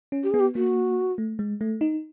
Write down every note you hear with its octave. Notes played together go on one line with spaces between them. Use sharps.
C#4
G4
B3 G#4
G4
A#3 F#4
A3
G#3
A3
D#4